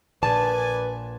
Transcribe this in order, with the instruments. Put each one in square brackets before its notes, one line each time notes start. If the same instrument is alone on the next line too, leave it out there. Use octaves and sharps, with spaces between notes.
[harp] A#1 A6 [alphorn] B4 [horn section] D5 G#5 [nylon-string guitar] A5